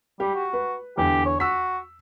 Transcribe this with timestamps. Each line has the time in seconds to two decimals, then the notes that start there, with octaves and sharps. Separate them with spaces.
0.20 G3 G4
0.35 F#4
0.53 B4
0.98 E2 D3 G4
1.26 C#5
1.40 F#4 E6 B6